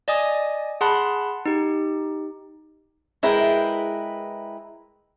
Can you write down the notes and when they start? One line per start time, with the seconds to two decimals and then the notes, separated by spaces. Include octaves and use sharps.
0.08 D5 D#5 G#5 D#6
0.81 G#4 F#5 A5 B5 C6 F#6
1.46 D#4 G4
3.23 G#3 E4 A#4 B4 G5